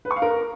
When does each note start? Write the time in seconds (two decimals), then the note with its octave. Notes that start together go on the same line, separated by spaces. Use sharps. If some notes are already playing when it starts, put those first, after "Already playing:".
0.05 B4
0.11 C#6
0.16 F5
0.22 A#4